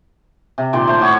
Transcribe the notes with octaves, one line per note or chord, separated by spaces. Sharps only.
C3
A#2 D#3 D5 C6
A3 C5 D5
A2 F#4 C#5